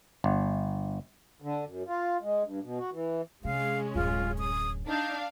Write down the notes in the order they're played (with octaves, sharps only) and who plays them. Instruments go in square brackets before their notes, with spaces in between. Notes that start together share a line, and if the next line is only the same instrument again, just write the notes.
[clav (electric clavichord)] G1
[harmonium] D3
F#2
F4
G#3
G2
B2
F#4
E3
[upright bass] C3 [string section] G#3 C#4 [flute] F5
[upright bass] D1 F#2 [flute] F4
[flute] D#6
[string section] D4 F5 [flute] D#4